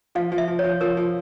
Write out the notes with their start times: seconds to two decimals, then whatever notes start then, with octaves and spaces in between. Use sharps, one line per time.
0.15 F3 F5
0.32 F3
0.38 E5
0.48 F3
0.59 F3 C#5
0.81 F3 A#4
0.97 F3